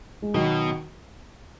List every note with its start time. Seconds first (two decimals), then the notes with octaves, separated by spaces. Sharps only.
0.22 G#3
0.34 B2 D#3 F#3